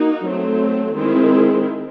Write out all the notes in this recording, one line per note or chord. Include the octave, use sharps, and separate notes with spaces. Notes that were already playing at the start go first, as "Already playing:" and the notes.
Already playing: A#3 D#4 F#4
F#3 A3 C4
D#3 G#3 C4 E4 G#4